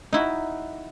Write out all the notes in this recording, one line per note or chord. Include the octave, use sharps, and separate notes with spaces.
D#4 E4 F#4